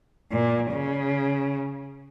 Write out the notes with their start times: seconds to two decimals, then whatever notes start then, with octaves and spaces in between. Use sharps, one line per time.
0.32 A#2
0.71 C#3